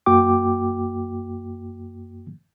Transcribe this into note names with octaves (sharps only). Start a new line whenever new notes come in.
F#2 A#3 F#4 G5 D6